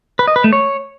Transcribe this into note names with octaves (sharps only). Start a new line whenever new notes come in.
B4
D#5
B4
A3
C#5